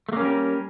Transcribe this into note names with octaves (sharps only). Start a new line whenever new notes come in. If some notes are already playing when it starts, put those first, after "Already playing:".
G3 A3 A#3 C#4 A#4